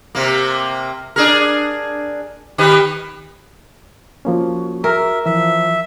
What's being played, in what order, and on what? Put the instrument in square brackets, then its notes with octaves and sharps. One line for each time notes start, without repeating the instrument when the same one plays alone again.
[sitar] C3 A#3
D4 G#4 A#4
D#3 G4 B4
[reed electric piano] F3 A#3 C#4 [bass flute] F#4
[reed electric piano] G#4 [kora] A#4 [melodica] E5
[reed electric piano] E3 [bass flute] F3 [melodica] E5